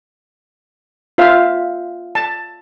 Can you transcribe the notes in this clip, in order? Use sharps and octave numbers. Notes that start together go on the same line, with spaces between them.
F4 C5 E5 F5
A5